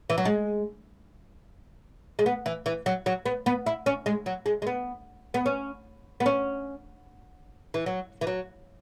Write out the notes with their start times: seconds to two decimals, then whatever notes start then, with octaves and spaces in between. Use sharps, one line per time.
0.10 E3
0.18 F#3
0.25 G#3
2.19 G#3
2.26 B3
2.46 E3
2.66 E3
2.86 F#3
3.06 F#3
3.26 B3
3.46 B3
3.66 E4
3.86 C#4
4.06 G#3
4.26 F#3
4.46 G#3
4.62 G#3
4.67 B3
5.34 B3
5.46 C#4
6.20 B3
6.26 C#4
7.74 E3
7.86 F#3
8.21 E3
8.27 F#3